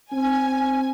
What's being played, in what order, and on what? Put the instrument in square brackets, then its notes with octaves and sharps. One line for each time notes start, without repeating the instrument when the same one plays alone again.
[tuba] C4 [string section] G#5